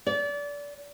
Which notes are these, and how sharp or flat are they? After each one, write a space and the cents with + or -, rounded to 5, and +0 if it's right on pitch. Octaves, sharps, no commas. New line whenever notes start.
D5 -30